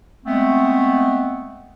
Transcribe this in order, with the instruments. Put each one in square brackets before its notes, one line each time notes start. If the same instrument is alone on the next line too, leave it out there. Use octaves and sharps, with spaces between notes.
[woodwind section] G#3 A3 B3 C4